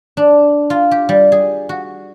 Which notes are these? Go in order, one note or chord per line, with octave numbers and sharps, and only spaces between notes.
D4
F4
G4
G3
G#4
F#4